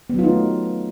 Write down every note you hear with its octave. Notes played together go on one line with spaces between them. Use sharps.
F#3 A3 B3 D#4 F4